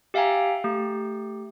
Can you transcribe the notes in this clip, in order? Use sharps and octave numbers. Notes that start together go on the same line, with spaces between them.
G4 E5 F5 G5 G#5 A#5
A3 G4